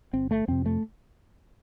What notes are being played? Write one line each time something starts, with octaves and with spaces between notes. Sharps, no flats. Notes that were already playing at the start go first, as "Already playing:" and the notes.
G1 C4
A3
F2 C3 C4
A3